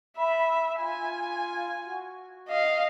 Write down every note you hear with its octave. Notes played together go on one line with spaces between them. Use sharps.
E5 B5
F4 G#5
F#4
D#5 F5